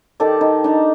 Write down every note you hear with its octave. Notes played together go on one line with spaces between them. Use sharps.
D#3 G4 A4 D5
D#4
D4 D#4 A#5